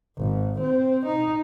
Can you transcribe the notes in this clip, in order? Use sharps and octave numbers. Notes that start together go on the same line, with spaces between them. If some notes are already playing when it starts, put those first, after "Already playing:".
G#1
C4
D#4